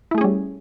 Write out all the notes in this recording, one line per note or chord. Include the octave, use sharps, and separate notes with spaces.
G3 A3 C#4 E4 G#4